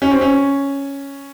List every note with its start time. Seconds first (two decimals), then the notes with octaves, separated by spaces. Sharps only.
0.02 C#4
0.11 C4
0.21 C#4